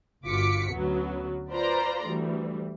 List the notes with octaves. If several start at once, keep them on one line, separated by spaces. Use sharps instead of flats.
G1 F4 F#4 D6 B6 C#7
D2 F#3 B3 C#4
F4 B4 C5 D5 A#5 C6
D2 E3 G3